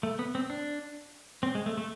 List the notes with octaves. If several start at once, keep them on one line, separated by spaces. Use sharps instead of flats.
A3
B3
C4
D4
C4
G#3
A3
A3